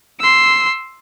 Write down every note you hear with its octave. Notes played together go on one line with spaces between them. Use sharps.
C6 E6